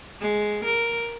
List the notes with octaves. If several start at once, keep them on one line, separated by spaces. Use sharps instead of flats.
G#3
A#4